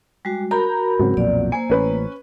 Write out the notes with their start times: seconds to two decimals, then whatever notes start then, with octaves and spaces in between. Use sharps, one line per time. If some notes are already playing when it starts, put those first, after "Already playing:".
0.25 G3 G#3 F#4
0.51 F#4 A#4 A#5 B5 G6
0.99 G#2 C#3 F#3 C4
1.17 B1 F2 A#2 D5
1.52 A#3 C5 G#5
1.70 A1 C#4 B4